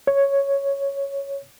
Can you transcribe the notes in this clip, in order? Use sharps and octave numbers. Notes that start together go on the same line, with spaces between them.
C#5